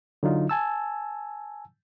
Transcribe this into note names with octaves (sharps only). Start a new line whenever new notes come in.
D3 F#3 D#4 F4
G#5 A5 E6